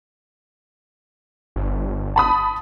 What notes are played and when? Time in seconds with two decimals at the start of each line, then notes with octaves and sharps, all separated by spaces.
1.56 G1
2.16 A5 B5 D#6